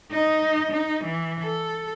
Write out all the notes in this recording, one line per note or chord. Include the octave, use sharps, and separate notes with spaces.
D#4 D#5
D#4
E3
A4